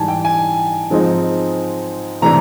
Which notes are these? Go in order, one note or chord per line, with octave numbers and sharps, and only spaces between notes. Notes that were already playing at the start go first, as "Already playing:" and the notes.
Already playing: G#2 E3 G3 G#5 A5
G5
G#5
G#2 F3 G#3 C4 D#4
C3 E3 A3 D4 A#5